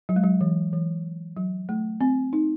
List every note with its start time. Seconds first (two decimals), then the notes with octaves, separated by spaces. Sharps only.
0.09 F#3
0.16 G#3
0.23 F#3
0.41 E3
0.73 E3
1.37 F#3
1.69 A3
2.01 C4
2.33 D#4